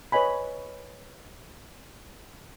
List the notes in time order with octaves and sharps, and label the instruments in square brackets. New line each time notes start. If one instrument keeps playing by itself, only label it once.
[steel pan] B4 C#5 D#5 G#5 B5